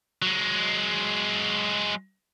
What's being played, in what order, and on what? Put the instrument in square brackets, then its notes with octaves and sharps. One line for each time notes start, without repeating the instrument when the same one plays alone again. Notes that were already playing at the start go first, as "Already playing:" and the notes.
[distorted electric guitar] F#3 G#3